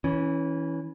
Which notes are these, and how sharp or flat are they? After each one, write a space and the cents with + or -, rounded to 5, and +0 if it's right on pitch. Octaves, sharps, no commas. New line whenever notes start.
E3 -20 C#4 +0